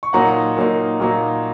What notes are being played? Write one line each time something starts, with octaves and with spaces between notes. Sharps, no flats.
C#6
A#2 F#3 A#3 D#4 F#5 A#5
A#2 F#3 A#3 D#4
A#2 F#3 A#3 D#4